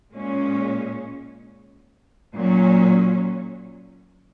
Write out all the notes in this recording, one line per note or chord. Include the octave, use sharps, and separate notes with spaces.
A#2 G#3 C#4
A#2 F#3 C#4